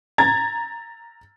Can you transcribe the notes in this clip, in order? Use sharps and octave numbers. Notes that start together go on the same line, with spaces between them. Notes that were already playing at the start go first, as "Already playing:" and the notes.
A#5 G#6 A6